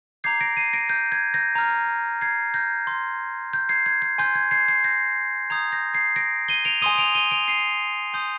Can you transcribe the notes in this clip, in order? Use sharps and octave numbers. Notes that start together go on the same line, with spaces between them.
A#5 D6 G6 G#6 C7
A#6 D7
C7 D#7
A#6 D7
G6
G#6
G6 A#6
A#5 F6
G#6 C7
G6 A#6
C6 G6
G6
G#6 C7
G#6
G#6
G#5 C6 G6
G#6
G#6 C7
G#6 C7
G6 A#6
A#5 D#6 G6 G#6
G6 A#6
G#6 C7
A#6 D7
D#7 G7
D7 F7
G#5 C6 D#6 D#7 G7
D7 F7
D#7 G7
D7 F7
C7 D#7
G#5 C6 D#6 G6